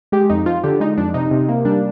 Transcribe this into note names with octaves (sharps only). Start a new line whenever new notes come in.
G#3 G4
F2 D#4
F3 F4
D3 G4
G#3 D#4
F2 D4
C3 D#4
C3
A#3
G3 D4